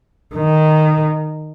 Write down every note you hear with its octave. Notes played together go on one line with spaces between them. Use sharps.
D#3